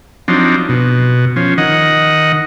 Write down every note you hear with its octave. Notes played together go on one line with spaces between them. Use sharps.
F3 F#3 C4 D4 D#4
B2
F3 C#4
D#3 D#5 F#5